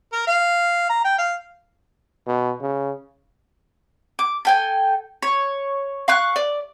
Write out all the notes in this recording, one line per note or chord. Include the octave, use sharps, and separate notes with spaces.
A#4
F5
A#5
G5
F5
B2
C#3
D6
A4 G5 G#5
C#5
F5 C#6 F#6
D5